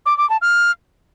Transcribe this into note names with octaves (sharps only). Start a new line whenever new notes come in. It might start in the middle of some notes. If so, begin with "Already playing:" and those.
D6
D6
A5
F6